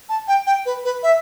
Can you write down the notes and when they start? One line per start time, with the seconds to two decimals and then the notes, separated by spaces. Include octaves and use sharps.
0.09 A5
0.28 G5
0.47 G5
0.66 B4
0.84 B4
1.03 E5